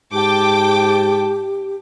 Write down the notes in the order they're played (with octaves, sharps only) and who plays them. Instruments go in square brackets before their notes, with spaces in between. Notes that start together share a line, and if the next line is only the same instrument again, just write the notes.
[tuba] G#2 [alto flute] G4 [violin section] G5 D6 [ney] A5